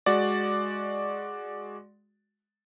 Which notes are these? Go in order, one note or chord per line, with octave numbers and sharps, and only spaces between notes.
G#3 F#4 D5